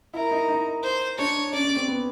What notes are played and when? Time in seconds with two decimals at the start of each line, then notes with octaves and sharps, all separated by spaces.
0.14 E4 A#4
0.31 D#4
0.48 D#4
0.83 C5
1.18 D4 C#5
1.53 C#4 D5
1.64 C#4
1.76 C4
1.88 B3